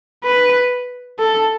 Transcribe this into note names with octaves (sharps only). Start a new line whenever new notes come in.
B4
A4